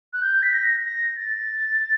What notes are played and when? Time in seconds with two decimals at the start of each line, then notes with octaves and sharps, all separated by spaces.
0.13 F#6
0.22 G6
0.43 B6
0.54 A#6
0.85 A#6
1.17 A6